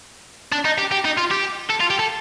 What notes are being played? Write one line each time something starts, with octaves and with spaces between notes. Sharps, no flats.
D4
D#4
G4
G4
D#4
F4
G4
A4
F4
G4
A4